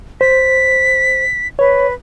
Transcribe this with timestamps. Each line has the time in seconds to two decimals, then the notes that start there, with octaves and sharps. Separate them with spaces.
0.21 C5 B6
1.59 B4 C#5